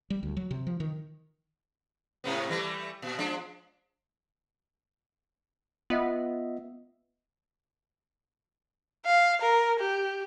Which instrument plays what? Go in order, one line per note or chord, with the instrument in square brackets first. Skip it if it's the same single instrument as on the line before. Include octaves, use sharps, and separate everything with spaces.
[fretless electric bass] G3
D2
F#3
C3
F3
D#3
[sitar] G#2 C3 B3
E3 G3 A3
A#2
F3 G#3 D4
[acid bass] B3 [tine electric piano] F4 D#5 E5
[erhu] F5
A#4
G4